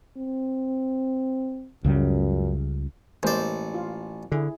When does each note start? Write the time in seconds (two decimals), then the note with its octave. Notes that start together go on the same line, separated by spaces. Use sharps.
0.17 C4
1.85 C#2 F#2 C#3 G3
3.23 A1 G#3 A#3 C5 D5
3.74 F4
4.32 D3 E4 G#4